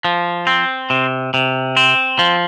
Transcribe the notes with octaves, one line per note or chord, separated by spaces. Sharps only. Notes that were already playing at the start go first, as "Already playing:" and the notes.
F3
C4
C3
C3
C4
F3